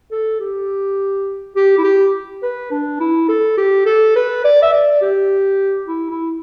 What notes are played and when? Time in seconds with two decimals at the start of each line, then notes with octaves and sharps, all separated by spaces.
0.11 A4
0.40 G4
1.56 G4
1.78 E4
1.84 G4
2.42 B4
2.71 D4
3.00 E4
3.28 A4
3.57 G4
3.86 A4
4.16 B4
4.44 D5
4.62 E5
4.73 D5
5.02 G4
5.88 E4
6.10 E4